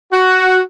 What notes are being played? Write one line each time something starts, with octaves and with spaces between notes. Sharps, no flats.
F#4